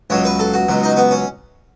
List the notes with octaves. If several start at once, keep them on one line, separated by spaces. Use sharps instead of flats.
C#2 B2 F#3 C#5
B4
A4
F#4
C#2 B2 F#3
D#4
B3
C#4